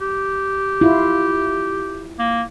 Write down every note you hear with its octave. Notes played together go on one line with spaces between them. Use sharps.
G4
E4 F4
A#3